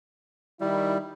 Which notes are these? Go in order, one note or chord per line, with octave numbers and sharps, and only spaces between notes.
D#3 G3 E4